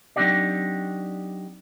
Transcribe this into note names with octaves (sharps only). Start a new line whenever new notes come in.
F#3 C4 D4 D#4 G4 D5